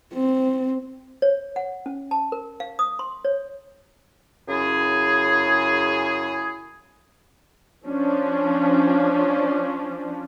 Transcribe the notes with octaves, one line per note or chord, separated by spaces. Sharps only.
C4
C#5
F#5
C#4
A5
A#4
F5
D#6
C6
C#5
F#2 C#3 E4 G#4
F3 C#4 D4